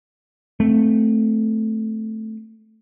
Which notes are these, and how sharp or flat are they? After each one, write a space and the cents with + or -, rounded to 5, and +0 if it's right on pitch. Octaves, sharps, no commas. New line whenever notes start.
A3 +0 C4 +0